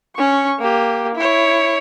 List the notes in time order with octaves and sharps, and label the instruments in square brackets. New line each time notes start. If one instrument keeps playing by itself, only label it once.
[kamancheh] C#4 C#6
A#3 G4
E4 C#5